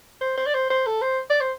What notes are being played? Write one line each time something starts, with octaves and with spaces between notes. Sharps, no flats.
C5
C5
D5
C5
C5
A4
C5
D5
C5